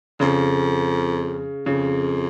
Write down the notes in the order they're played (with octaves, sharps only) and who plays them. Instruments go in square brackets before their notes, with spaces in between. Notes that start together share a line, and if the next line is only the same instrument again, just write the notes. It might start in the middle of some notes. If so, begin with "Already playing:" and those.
[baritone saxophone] F2 [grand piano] C#3
[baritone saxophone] F2 [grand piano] C#3